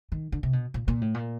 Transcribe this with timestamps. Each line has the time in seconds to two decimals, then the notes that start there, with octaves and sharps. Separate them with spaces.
0.12 D#3
0.32 D3
0.43 C3
0.53 B2
0.74 A#2
0.88 A#2
1.01 A2
1.14 A#2